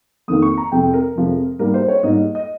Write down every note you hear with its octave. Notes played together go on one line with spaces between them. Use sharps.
F2 D#3 A#3 D#6
C#6
A#5
F2 C3 F3 G#3 G5
A#4
F2 C3 F3 G#3
G#2 G3 A#3 A#4
C5
C#5
G#2 G3 A#3 D#5
D#5